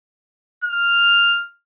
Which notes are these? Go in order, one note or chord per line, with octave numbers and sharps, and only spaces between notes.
F6